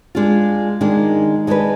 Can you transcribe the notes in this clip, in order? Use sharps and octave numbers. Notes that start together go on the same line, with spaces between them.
G#3 D4 F4
D#3 G#3 D4
G#3 D4 G#4 B4